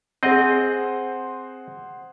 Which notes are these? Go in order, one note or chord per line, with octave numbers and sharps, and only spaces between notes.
C4 G#4 C5 D#5 F#5